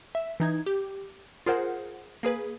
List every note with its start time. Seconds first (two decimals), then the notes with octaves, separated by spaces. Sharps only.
0.15 E5
0.40 E3 D#4 G#6
0.66 G4
1.46 F4 G#4 A#4 C5 F#5
2.23 A#3 G#4 B4